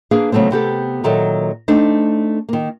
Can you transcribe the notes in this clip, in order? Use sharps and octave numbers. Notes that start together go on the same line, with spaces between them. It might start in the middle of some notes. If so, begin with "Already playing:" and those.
A#3 D4 G#4 B4 F5
C#3 F#3 A3 B3 C4
C3 B3 G4 A4
A#2 D#3 F#3 A4 E5
A3 C4 D4 D#4
D#3 A#3